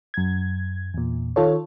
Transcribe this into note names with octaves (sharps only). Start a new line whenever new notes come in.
F#2 G#6
E2 A#2
D#3 F4 A4 C#5